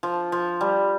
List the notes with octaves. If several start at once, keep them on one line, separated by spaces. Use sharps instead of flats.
F3
F3
G3